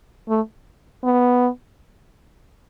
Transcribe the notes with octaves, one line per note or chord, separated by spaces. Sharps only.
A3
B3